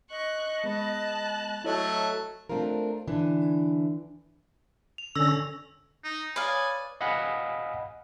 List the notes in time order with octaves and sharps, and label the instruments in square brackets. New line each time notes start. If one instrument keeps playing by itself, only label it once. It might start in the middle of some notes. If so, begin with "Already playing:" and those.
[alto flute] D#5 [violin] C#6 F#6
[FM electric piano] G#3 B3 B5 [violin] A5 F#6
[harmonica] F#3 A3 [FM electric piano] E4 C#5 D#5
[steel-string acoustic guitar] A3 C4 D4 F4 A#4
D3 E3 D4
[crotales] F7
[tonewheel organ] D3 C#4 A#6 [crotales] E6
[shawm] D#4
[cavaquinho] B4 D5 F5 [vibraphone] C#5 D#6 [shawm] G#5
[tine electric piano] D#5 F5 F#5 G#5 B5